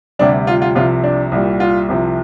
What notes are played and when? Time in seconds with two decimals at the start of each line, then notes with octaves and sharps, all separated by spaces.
0.19 D2 C3 G3 D4
0.47 F4
0.62 F4
0.75 C2 C3 F3 F4
1.04 D4
1.32 C2 A#2 G3
1.60 F4
1.89 C2 C3 F3